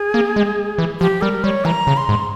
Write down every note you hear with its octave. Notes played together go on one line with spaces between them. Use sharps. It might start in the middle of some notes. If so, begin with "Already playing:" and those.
Already playing: G#4
A#3
G#3
E3
F3 G4
G3 A#4
G3 C#5
E3 A#5
C#3
C6
G#2